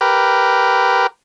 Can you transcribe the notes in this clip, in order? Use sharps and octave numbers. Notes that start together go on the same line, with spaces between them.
G4 A#4 B4